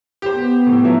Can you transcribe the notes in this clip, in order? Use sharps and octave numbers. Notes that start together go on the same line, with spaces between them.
G4 C5
B3
A2 E3
F3 F#3 E4